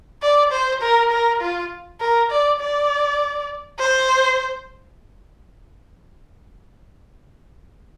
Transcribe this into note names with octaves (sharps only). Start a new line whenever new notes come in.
D5
C5
A#4
A#4
F4
A#4
D5
D5
C5